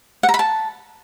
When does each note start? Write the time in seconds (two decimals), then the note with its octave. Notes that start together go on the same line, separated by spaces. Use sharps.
0.23 F#5
0.29 A#5
0.34 B5
0.39 A5